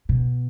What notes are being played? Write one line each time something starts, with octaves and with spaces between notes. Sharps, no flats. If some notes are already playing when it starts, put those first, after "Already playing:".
B2